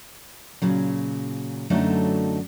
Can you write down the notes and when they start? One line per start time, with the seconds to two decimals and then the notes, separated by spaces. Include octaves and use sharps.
0.62 A#2 C#3 F#3
1.70 F#2 D3 F#3 A3 D#4 A4